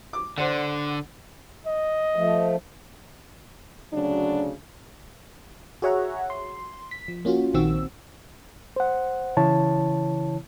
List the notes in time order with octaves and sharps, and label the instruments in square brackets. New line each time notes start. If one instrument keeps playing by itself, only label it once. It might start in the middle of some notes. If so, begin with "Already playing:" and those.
[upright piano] D6
[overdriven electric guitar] D3 [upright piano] C5 D5 F#5
[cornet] D#5
[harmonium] F3 A3
[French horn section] D2 C#3 F#3 D4
[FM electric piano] F#4 G#4 C#5 E5 F#5 A#5
C6
B6
F3
A#3 C#4 F4 F#4
A#1 A#2 D#3 C4 F#4 E6
[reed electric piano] C5 F#5
C#3 E3 E4 C#5 A5